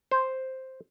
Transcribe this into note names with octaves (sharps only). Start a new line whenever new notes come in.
C5